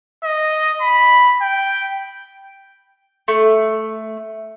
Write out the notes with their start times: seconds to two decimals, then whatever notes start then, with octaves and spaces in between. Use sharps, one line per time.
0.24 D#5
0.81 B5
1.42 G5
3.28 A3